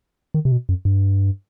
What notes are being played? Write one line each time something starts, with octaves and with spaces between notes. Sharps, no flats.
D#3
C3
B2
F#2
G2